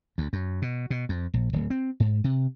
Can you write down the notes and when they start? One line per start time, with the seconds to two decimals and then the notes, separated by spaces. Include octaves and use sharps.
0.18 D2
0.33 F#2
0.62 B2
0.90 B2
1.09 F2
1.34 A#1
1.53 D1
1.70 C4
2.00 G#2
2.24 C3